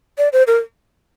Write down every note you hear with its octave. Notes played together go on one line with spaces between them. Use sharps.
D5
C5
A#4